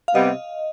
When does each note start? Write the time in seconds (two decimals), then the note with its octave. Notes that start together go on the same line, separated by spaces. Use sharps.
0.08 F5
0.14 C3 G3 B3 D#5